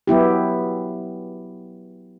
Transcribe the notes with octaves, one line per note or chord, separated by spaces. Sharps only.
F#3 B3 E4 G4